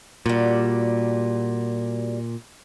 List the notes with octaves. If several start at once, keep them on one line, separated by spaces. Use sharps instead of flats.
A#2 G3 F#4